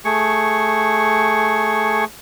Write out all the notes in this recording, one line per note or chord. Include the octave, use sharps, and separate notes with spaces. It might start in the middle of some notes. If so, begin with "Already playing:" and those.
A3 G#4 C#6